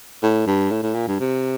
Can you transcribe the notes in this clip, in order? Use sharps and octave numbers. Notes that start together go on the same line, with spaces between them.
A2
G2
A2
A2
A#2
G2
C3